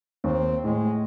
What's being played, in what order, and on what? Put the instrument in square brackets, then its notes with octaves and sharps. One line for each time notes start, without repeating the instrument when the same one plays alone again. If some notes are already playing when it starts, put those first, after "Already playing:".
[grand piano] D#2 [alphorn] C4
[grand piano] A2 [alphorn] G#3